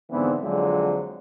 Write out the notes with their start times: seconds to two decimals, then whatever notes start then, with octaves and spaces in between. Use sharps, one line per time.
0.11 G#2 D3 E3 F3 B3 C4
0.41 F2 D3 F3 F#3 G#3 C4